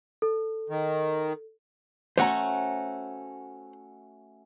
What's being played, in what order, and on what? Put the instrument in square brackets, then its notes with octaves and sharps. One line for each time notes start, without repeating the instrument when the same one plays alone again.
[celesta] A4
[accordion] D#3
[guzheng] A3 C#4 F#4 [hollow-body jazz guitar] C5 F#5 A#5